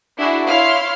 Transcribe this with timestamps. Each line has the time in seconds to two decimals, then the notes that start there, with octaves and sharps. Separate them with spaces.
0.17 D4 E4 F#4 G#4
0.48 E4 C#5 F5 C6 F6